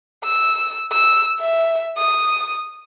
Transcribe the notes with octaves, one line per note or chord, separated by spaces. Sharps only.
E6
E6
E5
D#6